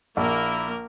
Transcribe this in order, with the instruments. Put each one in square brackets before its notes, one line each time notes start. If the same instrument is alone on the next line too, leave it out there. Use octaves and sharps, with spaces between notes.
[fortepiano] A#1 [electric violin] A#3 A#4 [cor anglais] E4